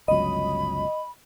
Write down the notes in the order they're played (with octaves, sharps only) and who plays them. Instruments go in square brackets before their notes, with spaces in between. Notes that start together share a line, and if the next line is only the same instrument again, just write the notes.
[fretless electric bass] G1 C#2 F#3 [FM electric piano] D#5 [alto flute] B5